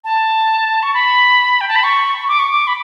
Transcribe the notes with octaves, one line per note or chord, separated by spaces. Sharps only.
A5
C#6
B5
G5
A5
B5
C#6
D6
C#6
D6
B5